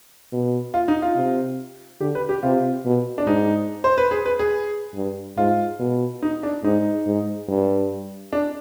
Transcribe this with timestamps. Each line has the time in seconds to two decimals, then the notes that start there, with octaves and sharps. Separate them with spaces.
0.33 B2
0.74 F4
0.88 D#4
1.02 F4
1.16 C3
2.00 D3 G4
2.15 B4
2.29 G4
2.43 C3 F4
2.85 B2
3.18 D4
3.26 G#2 D#4
3.84 C5
3.98 B4
4.11 G#4
4.26 B4
4.39 G#4
4.95 G2
5.37 G#2 F4
5.79 B2
6.22 D#4
6.43 D4
6.63 G#2 D#4
7.06 G#2
7.48 G2
8.33 D4